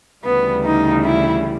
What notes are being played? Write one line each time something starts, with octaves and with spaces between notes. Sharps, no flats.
D2 C#3 E3 G3 B3
D#4
E4